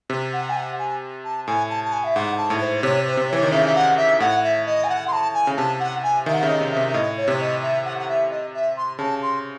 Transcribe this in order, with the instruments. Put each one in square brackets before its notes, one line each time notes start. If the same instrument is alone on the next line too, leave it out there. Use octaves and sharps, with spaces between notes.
[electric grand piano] C3
[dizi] F#5
G#5
F#5
G#5
A5
[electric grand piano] A2 [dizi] G#5
[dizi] A5
A5
G#5
E5
[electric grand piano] G#2 [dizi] F#5
[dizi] A5
[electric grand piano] A2
[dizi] C5
C5
[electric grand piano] C3 [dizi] C#5
[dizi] C5
[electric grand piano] C3
[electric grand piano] E3 [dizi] C#5
[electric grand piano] D#3
[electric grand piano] C#3 [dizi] E5
[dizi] E5
F#5
E5
[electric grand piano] A2 [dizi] F#5
[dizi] E5
D#5
G#5
F#5
C6
A5
G#5
[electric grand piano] C#3
[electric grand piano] C3 [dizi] A5
[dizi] F#5
G#5
[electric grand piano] D#3 [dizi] E5
[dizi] F#5
[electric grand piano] C#3 [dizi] E5
[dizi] D#5
[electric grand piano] C3
[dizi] E5
[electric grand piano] C3
[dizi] E5
[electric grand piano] A2 [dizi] D#5
[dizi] C#5
[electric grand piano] C3
[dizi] D#5
E5
F#5
F#5
E5
D#5
E5
C6
[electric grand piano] C#3 [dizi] A5
[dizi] C6